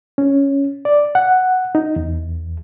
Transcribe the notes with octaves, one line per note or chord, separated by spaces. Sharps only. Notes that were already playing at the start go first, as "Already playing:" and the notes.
C#4
D5
F#5
D#4
E2